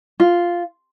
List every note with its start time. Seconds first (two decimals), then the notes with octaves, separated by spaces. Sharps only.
0.20 F4